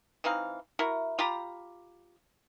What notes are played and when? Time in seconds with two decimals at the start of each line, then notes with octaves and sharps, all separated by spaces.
0.24 E3 C4 D#4 F5
0.79 E4 F#4 A#4
1.19 F4 G4 A#5 B5